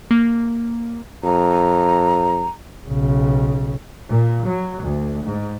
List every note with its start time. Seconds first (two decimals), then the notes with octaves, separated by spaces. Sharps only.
0.11 A#3
1.24 F2 A#5
2.88 B1 C#3
4.09 A#2
4.46 F#3
4.80 D2
5.25 G#2